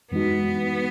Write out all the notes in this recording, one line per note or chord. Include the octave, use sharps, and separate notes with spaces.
F#2 E3 G#3 B3 D#4 F#4